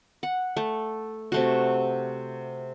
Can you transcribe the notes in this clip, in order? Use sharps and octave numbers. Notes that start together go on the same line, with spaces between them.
F#5
A3
C3 A3 F#4